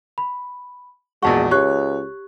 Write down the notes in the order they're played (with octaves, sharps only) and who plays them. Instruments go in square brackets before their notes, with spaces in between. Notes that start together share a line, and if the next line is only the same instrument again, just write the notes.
[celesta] B5
[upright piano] A#1 E2 F#4 [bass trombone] G#3 [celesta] A5 C#6
[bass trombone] C#2 [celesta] G4 C#6 F#6 [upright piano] C#5